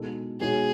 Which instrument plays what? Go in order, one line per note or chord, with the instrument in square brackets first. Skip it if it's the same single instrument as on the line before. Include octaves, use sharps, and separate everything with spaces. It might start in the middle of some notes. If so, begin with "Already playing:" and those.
Already playing: [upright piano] B2 G#3 D#4 A4
[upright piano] B2 G#3 D#4 F#4 C#5 [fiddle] G#4